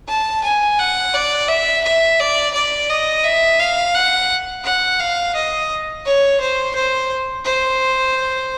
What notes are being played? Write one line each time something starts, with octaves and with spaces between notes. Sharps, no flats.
A5
G#5
F#5
D5
E5
E5
D5
D5
D#5
E5
F5
F#5
F#5
F5
D#5
C#5
C5
C5
C5